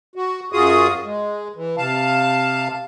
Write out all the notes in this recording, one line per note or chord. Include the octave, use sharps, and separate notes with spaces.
F#4
F#2 F4 F#4 G#4 D#6
G#3
E3
C3 F5 A5